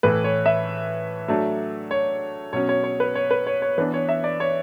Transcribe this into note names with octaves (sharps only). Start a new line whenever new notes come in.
A2 E3 A3 E4 B4
C#5
E5
F#3 A3 D4
C#5
B2 F#3 C#4 C#5
C#5
C#5
B4
C#5
B4
C#5
C#5
E3 B3 D4 B4
C#5
E5
D5
C#5